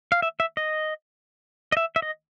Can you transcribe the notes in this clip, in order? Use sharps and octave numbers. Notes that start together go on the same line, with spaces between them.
F5
E5
E5
D#5
D#5
E5
E5
D#5